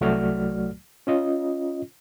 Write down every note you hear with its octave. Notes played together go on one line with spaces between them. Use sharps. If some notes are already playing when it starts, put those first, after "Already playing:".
C2 F#3 A3 F#4 D5 F6
C#4 F4 D#5